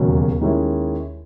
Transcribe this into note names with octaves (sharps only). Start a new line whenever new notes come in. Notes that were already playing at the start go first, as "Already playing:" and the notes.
Already playing: E1 D#2 C#3 F#3
D#2 D#3 G#3 C#4 E4